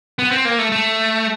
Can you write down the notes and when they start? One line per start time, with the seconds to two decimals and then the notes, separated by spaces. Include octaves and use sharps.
0.19 B3
0.32 C4
0.45 A#3
0.59 A3
0.72 A3